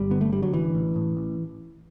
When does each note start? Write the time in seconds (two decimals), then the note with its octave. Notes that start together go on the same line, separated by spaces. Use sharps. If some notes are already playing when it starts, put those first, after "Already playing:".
Already playing: G1 G3
0.11 D3 B3
0.21 A3
0.32 D3 G3
0.43 F#3
0.53 A1 E3
0.75 A1
0.96 A2
1.17 A1